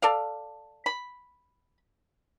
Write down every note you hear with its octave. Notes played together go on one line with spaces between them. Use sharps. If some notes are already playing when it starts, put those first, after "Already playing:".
A4 D5 F5
B5